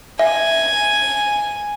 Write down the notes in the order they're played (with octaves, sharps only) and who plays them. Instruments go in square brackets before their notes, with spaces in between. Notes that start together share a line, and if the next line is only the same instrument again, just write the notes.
[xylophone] E5 [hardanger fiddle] G#5